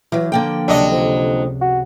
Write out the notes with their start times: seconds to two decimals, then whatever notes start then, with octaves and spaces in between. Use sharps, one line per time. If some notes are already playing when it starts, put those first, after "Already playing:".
0.12 E3 F#3 F6 G6 A#6
0.32 D3 F3 A#3 G5
0.68 C#2 C3 F#3 G3 D4 D#5
0.92 F2
1.61 F#4